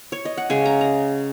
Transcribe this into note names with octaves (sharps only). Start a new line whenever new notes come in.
C#5
D#5
F#5
C#3 G#3 G#5
A#5
A#5